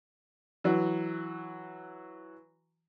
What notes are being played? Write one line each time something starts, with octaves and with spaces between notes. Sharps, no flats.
E3 F#3